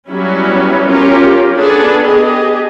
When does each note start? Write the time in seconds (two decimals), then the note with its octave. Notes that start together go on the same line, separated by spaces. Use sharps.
0.11 F#3 G3 B3 C#4 E4 F#4
0.88 C#4 F4 G4 A#4
1.56 B3 D4 G#4 A4
2.06 G4 G#4 D#5